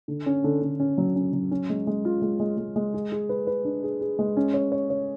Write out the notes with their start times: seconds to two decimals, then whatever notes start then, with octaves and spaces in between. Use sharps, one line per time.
0.08 D3
0.26 C#4
0.44 D3
0.62 D3
0.80 C#4
0.98 F#3
1.16 C#4
1.33 F#3
1.51 C#4
1.69 G#3
1.87 G#3
2.05 F4
2.22 G#3
2.40 G#3
2.58 G#3
2.76 G#3
2.94 G#4
3.12 G#4
3.29 B4
3.47 B4
3.65 D4
3.83 G#4
4.01 G#4
4.19 G#3
4.37 C#4
4.54 C#5
4.72 C#5
4.90 C#5